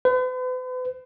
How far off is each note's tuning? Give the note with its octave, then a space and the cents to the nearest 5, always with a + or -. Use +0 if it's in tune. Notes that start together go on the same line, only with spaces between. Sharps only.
B4 +45